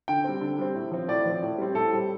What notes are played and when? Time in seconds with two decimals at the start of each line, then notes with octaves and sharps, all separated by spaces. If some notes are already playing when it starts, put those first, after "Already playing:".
0.08 D3 G5
0.24 G3 C4
0.41 D3
0.59 G3 C4
0.75 A2
0.92 F3 C4
1.08 A2 D5
1.25 F3 C4
1.43 A2
1.58 G3 C4
1.75 A2 A4
1.93 G3 C4